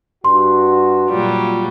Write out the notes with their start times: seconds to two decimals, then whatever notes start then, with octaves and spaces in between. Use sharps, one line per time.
0.25 G2 F#4 C6
1.09 A#2 F#3 G3 F4